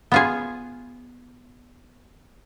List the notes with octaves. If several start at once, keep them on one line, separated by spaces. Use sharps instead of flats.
B3 F4 G#4